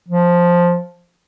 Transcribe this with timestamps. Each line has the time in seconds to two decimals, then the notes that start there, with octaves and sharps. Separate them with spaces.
0.08 F3